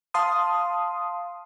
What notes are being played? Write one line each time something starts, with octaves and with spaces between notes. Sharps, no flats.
F5 A5 C6 D#6